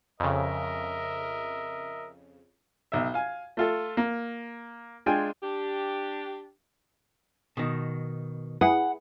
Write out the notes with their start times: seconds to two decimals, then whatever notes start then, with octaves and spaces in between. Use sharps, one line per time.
0.20 F2 C#3 A#4 D#5 E5
2.92 B1 E5
3.14 F5 G#5
3.57 A3 F4 A4
3.97 A#3
5.06 G#3 D4 F4 G5 G#5
5.43 D4 G4
7.57 B2 D#3
8.61 E4 G#4 B4 F#5